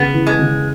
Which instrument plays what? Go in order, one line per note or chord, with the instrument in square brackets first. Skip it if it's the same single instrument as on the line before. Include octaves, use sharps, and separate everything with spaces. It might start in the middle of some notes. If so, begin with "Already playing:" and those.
Already playing: [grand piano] C#3 [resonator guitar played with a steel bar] B3
[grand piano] E3
[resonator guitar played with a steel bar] G#3
[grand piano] C#3